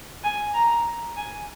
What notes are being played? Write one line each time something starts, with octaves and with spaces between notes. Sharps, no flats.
G#5
A#5
G#5